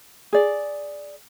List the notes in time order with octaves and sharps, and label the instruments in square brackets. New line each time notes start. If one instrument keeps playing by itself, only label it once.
[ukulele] G#4 D5